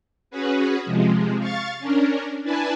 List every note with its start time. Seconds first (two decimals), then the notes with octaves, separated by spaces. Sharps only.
0.31 C#4 F#4 G#4 B4
0.86 C3 F3 G#3
1.39 F5 C#6 A6
1.79 C#4 D4 A#4
2.44 D4 E4 B4 G#5 A5